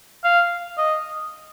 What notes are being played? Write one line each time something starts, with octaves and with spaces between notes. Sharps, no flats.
F5
D#5